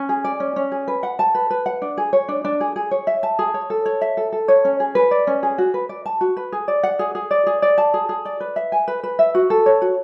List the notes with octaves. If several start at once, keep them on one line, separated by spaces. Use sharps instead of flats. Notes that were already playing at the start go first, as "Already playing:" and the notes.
Already playing: C#4
G#4
D5
C#4
C#4
G#4
B4
F#5
A5
B4
B4
F#5
D4
G#4
C#5
D4
D4
G#4
G#4
C#5
E5
A5
G#4
C#5
A4
C#5
E5
A4
A4
C#5
C#4
G#4
B4
D5
C#4
G#4
F#4
B4
D5
A5
F#4
B4
G#4
D5
F#5
G#4
G#4
D5
G#4
D5
A5
G#4
G#4
D5
B4
E5
G#5
B4
B4
E5
F#4
A4
C#5
F#4